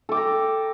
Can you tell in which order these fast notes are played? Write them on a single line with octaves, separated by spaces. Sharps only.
A4 D6 G5 A#5